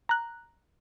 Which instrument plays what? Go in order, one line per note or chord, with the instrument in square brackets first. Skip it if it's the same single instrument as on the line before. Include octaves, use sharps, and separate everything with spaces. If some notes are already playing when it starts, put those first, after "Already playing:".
[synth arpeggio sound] A#5 F#6